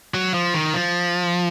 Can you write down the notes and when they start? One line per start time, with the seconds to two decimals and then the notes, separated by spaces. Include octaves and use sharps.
0.14 F#3
0.34 F3
0.54 D#3
0.73 F3